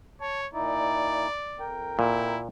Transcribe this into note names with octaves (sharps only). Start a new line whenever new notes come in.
C#5 A5
A#2 D#4 E4 D5
F2 A#4 G5
A#2 E4